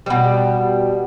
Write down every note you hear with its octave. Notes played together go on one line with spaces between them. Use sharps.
B2 G3